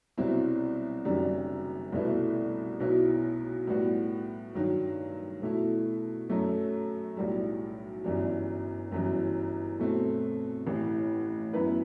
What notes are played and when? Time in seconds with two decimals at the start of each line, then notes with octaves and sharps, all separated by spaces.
0.18 C2 B2 F#3 C4 E4
1.05 F#1 F#2 D#3 G3
1.92 C2 B2 A3 E4 B4
2.80 B1 B2 F#3 B3 E4
3.67 A2 G3 B3 F#4
4.54 G2 D#3 F#3
5.42 B2 A3 E4
6.30 F#2 F#3 A3
7.17 B1 A2 G3
8.04 G1 F#2 E3 G3
8.92 G1 F#2 E3
9.79 B2 A3 C4
10.66 A1 A2 E3
11.54 F#2 F#3 B3 E4 B4